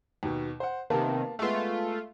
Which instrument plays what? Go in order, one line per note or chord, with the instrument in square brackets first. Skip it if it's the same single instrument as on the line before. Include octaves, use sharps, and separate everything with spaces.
[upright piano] D#2 B2
C5 F#5
[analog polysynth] C3 D#3 [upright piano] A#3 B3 A5
[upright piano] G#3 B3 [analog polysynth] A3 F4